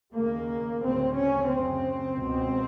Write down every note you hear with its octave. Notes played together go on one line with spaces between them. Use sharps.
D#2 C#3 A#3
D2 C#3 C4
C#4
F#2 C#3 C4
C#2 B2